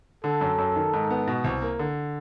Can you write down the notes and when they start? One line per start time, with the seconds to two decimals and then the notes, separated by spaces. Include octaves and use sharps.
0.24 D3 A4
0.41 F#2
0.58 F#2
0.76 D#3
0.93 G#2
1.10 B3
1.27 B2
1.44 C2
1.62 A#3
1.79 D3